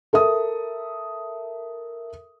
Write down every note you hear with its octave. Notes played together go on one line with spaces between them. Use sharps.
A4 A#4 E5 D#6